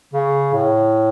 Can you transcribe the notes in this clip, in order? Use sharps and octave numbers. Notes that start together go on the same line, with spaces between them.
C#3
A2